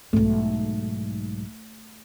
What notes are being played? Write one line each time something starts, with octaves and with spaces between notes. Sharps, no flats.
B1 G#2 A3